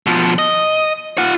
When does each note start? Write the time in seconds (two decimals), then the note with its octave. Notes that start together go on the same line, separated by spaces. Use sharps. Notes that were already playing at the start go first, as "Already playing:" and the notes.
0.06 B2 F3
0.39 D#5
1.18 F4 F#5